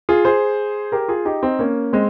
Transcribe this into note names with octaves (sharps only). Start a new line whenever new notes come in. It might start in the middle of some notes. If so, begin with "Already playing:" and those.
F4 G#4
G#4 C5
G4 A#4
F4 G#4
D#4 G4
C4 D#4
A#3 C#4
G#3 C4